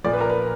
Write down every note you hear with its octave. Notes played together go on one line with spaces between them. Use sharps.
A#2 F3 D5
B4
A#4
B4